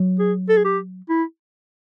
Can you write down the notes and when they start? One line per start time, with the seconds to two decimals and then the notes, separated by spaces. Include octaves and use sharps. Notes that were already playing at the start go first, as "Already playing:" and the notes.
Already playing: F#3
0.19 G#4
0.49 A4
0.57 G#4
0.65 G4
1.10 E4